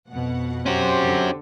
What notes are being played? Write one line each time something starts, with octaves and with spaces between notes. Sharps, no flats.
F2 B2 F#5
C4 C#4 F#4 G4 C5
D3